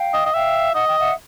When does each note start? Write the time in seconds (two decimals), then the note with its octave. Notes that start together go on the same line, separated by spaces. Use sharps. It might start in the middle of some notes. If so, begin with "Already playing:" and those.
Already playing: F5 G5
0.14 D#5
0.26 D#5
0.34 E5 F5 G5
0.74 D#5 F#5
0.87 G5
0.99 E5 F#5